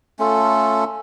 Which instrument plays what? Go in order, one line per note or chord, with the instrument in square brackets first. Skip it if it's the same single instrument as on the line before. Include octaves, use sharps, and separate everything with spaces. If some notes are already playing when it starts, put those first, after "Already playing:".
[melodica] A3 C#4 F4 A4